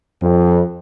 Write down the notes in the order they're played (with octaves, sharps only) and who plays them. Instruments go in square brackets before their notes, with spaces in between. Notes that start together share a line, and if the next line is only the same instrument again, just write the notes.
[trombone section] F2